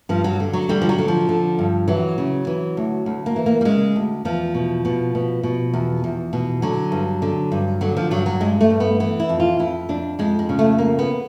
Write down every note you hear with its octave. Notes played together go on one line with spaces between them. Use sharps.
G2 F3
F#3
D3
F#3
D3 G3
F3
F#3
D3
F3
D3
G2
E3 F#3
C#3
E3
D2
D2
A#3
E3
A#3
G3
C#3 G#3
D2
E2 F3
B2
B2
B2
B2
E2
E2
B2
D3 F#3
G2
D3
G2
D3 F#3
F3
G2 F#3
F#3
G2 G#3
A3
G2
B3
E3 B3
E4
F2
F4
F2 E4
F2 D4
F2 G#3
G#3
C#3
A3
F2 A#3
B3